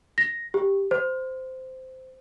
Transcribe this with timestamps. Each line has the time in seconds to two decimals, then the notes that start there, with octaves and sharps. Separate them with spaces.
0.18 A#6
0.54 G4
0.91 C5